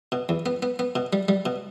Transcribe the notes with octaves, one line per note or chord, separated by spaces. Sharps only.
B2
E2
B3
B3
B3
B2
G3
G3
B2